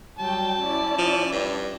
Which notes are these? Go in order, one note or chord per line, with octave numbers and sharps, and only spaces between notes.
F#3 G3 G5 A5
C#4 E4 D5
F3
G2